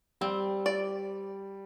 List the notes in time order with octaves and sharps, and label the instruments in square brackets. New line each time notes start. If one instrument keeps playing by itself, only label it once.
[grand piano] G3 [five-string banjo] C4
[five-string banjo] D5